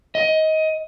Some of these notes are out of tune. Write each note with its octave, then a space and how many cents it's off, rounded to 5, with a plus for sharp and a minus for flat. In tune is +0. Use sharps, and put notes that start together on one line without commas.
D#5 +20